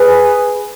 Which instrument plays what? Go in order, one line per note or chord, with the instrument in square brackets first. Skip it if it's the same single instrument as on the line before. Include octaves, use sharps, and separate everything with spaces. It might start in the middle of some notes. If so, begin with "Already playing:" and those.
Already playing: [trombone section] G#4 B4